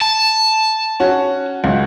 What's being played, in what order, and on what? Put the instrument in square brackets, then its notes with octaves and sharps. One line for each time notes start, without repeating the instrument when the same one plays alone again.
[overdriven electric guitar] A5
[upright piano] C#4 F#4
C#2 F#4